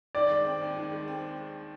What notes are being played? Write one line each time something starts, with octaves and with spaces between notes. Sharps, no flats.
D#3 D5
G#3
C4
D#2
D#3
G#3
C4